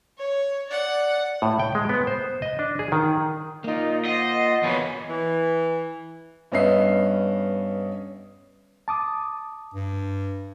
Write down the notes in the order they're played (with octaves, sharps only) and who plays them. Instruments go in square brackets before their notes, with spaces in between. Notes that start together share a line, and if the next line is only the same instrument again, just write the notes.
[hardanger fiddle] C#5
D5 F#5
[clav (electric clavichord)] A2
G5
G#3
B3
C5
D#5
D4
G#4
D#3
[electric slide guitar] A#3 F4 [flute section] D#4 D5
[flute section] C5 D5 F#5 [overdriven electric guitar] D#5
[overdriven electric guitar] E2 B2 [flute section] C#5 B5
[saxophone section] E3
[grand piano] G2 B3 C#4 D#5 E5 C7
[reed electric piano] A5 D6 D#6
[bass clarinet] G2